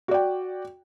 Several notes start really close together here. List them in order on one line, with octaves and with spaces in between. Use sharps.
F#4 D5 G5